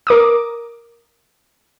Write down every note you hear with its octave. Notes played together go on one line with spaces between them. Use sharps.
A#4 D6 D#6